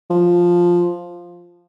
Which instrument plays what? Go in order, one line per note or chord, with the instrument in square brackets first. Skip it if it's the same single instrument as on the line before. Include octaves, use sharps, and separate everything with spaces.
[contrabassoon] F3